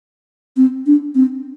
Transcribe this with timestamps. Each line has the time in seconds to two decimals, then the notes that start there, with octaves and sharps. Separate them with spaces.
0.57 C4
0.87 D4
1.15 C4